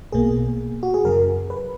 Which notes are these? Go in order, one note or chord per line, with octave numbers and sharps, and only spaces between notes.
B1 B2 A#3 G#4
F#4
G#4
F#2 C#3 F#3 A#4
B4